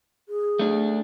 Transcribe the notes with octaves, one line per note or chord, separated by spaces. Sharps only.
G#4
A3 D4